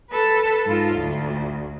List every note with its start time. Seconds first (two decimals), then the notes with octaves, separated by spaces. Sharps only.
0.11 A4 B4
0.65 G#2 F4
0.95 D2